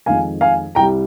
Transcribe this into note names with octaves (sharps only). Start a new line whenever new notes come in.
F2 D#3 G#3 F5 G#5
F5 G#5
C2 C3 G3 G5 A#5